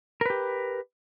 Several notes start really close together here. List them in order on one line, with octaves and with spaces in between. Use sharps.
A#4 B4 G4